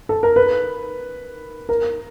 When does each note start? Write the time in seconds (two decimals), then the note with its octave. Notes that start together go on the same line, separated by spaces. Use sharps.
0.09 A4
0.23 A#4
0.36 B4
1.69 A#4